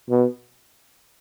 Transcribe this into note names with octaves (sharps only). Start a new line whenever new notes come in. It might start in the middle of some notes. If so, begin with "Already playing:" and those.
B2